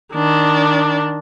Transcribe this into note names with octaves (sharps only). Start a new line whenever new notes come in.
D#3 D4